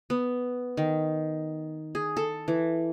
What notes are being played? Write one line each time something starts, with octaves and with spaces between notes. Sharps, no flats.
B3
D#3
G#4
A4
E3